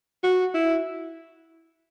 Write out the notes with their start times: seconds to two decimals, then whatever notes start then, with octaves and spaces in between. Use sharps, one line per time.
0.23 F#4
0.54 E4